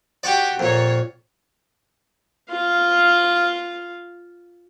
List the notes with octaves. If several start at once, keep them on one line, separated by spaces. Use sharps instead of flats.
F#4 G4 D5 C#6 D6
F2 A#2 A#3 C#5
F4 F5